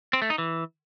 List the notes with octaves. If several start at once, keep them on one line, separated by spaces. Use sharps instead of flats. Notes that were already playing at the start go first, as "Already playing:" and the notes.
C4
A3
D#4
E3